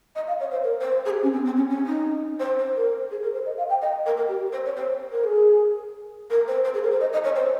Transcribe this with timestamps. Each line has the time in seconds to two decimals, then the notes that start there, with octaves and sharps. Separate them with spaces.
0.15 D#5
0.28 F5
0.40 C#5
0.51 C5
0.64 A#4
0.81 C5
1.05 G#4
1.10 G4
1.23 C#4
1.33 C4
1.45 C4
1.57 C#4
1.70 C#4
1.86 D#4
2.40 C5
2.58 C5
2.76 A#4
3.11 G#4
3.23 A#4
3.34 C5
3.46 D#5
3.58 F5
3.69 G5
3.82 D#5
4.06 A#4
4.17 A#4
4.28 G4
4.52 C5
4.65 C#5
4.76 C5
5.12 A#4
5.24 G#4
6.30 A#4
6.48 C5
6.64 C5
6.74 G#4
6.83 A#4
6.91 C5
7.01 D#5
7.13 D#5
7.24 C#5
7.36 C5